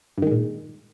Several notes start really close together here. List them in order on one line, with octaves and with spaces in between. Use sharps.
G2 D#3 G#3 A#2